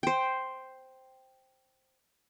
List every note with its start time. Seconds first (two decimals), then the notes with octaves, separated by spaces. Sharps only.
0.03 C5 G5